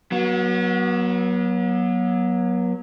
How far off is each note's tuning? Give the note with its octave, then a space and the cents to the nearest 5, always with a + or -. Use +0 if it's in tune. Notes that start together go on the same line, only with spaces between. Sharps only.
F#3 +0 B3 -40